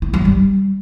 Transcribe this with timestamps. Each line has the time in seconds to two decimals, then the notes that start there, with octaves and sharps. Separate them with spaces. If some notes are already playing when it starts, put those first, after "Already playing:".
0.02 E4
0.14 F#3
0.25 G3